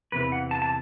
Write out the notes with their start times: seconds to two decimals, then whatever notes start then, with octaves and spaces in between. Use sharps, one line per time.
0.12 E2 C3 E3 B4
0.32 F#5
0.51 A5
0.62 A5